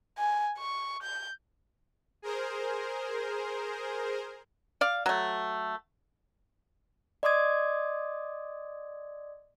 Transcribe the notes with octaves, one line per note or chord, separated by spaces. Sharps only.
G#5
C#6
G6
G#4 A#4 C5
D5 F5
F#3 A3
D5 D#5 C6 D6 D#6 G#6